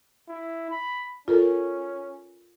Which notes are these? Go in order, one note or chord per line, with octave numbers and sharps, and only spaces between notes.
E4
B5
C#4 F4 A4 A#4